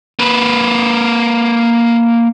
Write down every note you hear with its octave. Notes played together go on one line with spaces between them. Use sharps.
A#3 B4